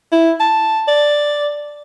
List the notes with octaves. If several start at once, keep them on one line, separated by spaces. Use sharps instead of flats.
E4
A5
D5